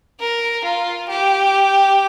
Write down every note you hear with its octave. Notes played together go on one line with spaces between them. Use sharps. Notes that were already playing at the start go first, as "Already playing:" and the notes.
A#4
F4
G4